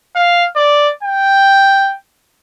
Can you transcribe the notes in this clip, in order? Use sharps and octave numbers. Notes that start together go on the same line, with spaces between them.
F5
D5
G5